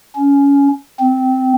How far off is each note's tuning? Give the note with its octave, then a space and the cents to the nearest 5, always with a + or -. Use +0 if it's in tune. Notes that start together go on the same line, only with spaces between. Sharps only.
C#4 +20
C4 -10